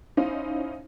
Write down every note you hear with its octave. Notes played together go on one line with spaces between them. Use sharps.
C#4 D#4 E4 C5 F5